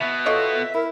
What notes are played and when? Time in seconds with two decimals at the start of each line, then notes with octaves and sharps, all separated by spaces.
0.01 B2 B3 E5
0.26 F4 A4 C#5 D#5
0.74 E4 A#4